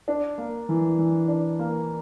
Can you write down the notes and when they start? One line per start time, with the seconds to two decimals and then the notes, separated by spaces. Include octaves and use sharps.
0.08 D4
0.38 A#3
0.69 E3
0.99 E3
1.28 D4
1.59 A#3